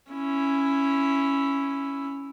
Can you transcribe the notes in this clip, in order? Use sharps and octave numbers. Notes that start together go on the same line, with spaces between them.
C#4 E4